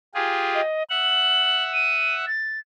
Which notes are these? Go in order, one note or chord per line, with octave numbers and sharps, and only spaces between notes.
F4 G4 G#4
D#5
E5 F#5 F#7
D#7
A6